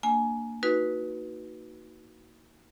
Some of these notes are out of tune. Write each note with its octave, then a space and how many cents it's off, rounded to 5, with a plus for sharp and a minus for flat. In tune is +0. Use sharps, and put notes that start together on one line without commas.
A#3 -15 D4 +10 G#5 +15
D#4 +25 F#4 +0 B4 -10